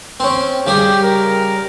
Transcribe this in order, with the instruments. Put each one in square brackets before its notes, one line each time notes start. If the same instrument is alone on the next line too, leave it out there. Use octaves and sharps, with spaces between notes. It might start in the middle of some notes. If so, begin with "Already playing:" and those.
[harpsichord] C4 C#4
[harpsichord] C#3 G3 G#4 [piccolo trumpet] G4
[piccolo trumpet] A#4